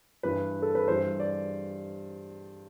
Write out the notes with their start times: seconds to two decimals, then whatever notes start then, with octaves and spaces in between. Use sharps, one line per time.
0.23 G2 E3 G3 B4
0.62 A4
0.75 B4
0.88 G2 E3 G3 C5
1.20 D5